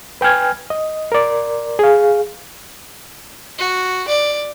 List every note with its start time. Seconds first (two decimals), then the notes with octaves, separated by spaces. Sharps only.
0.21 B4 G5 G#5 F6 G#6
0.70 D#5
1.12 A#4 D5
1.79 G#4 F5
3.59 F#4
4.08 D5